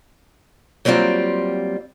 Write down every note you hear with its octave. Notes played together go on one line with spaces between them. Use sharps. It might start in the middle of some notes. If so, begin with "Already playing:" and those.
F#3 G3 A#3 C4 F4